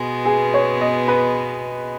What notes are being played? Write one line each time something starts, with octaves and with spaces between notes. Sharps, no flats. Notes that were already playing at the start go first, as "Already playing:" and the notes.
Already playing: B2 G#3 B3
G#4
C#5
D#5
B4